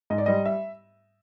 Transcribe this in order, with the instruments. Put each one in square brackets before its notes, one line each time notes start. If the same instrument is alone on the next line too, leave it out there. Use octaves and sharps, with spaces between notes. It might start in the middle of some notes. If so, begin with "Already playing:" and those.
[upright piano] G#2 D#5
D5
G3 D#5
E5